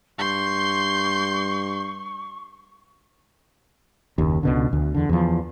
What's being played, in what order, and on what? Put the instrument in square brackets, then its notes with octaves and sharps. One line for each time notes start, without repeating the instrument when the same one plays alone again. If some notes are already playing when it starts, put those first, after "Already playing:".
[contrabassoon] G2 [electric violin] C6 G6 [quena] C#6
[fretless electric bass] F#1 D#2
C#2 B2 D3
D2
E2 D3
E2 F3